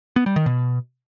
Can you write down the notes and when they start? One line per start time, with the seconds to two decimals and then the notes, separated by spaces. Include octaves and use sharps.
0.16 B3
0.26 G3
0.36 D#3
0.46 B2